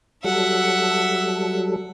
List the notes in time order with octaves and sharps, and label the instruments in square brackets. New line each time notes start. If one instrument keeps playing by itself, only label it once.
[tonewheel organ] F#3 G3 A4 [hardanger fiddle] E5 F#5